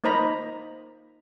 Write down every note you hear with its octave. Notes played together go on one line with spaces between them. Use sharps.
A#3 D#4 C5 D#5 A#5 B5